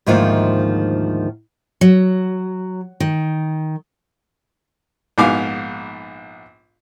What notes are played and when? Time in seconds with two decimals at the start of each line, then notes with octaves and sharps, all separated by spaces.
0.06 D2 G#2 D#3 F3 A#3 F4
1.81 F#3
3.00 D#3
5.18 A#1 G#2 B3 F5 G#5 D6